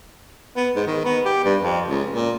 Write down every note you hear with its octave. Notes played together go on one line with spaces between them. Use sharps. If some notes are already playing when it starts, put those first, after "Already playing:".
B3
G#2
D#3
B3
G4
G2
F2
C#2
A#2